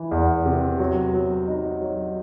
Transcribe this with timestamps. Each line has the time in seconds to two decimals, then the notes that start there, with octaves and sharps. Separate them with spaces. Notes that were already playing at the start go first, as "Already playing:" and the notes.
Already playing: E3
0.11 E2
0.46 C3
0.79 F#3
1.14 F#3
1.48 D#4
1.82 F#3